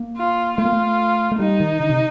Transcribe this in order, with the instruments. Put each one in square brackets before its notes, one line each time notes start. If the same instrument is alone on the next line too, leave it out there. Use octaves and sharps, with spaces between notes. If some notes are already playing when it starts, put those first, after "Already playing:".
Already playing: [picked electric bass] A#3
[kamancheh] F4
[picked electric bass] A3 [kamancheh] F4
[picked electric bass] A#3
A3
A3
[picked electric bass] G3 [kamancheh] D#4
[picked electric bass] D#3
D3
C3